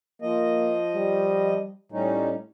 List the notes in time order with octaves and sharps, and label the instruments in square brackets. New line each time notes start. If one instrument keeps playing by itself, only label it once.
[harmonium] F3 D#5 [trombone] A#3
[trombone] G3
[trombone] A2 [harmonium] G3 C#4 D#4